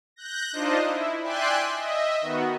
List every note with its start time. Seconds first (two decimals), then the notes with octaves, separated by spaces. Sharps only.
0.16 F#6 G6 A#6
0.53 D4 D#4 F4 C5 D#5
0.87 E4
1.22 D5 E5 G5 G#5 C6 F#6
1.76 D#5 E5
2.21 D#3 B3 F#4